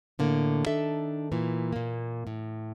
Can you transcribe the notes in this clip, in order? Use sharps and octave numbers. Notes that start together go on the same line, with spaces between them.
A2 D3 A#3
D#3 D4 A4 E5
A#2 E3
A#2 A#3
A2